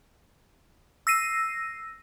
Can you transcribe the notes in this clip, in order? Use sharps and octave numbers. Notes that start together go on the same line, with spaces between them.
E6 A#6 C7 D#7